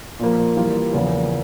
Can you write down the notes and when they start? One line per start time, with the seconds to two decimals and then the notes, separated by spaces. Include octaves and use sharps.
0.19 A#2 F3 A#3
0.56 E3 G3 A#3 F4
0.93 E2 C#3 F3 A#3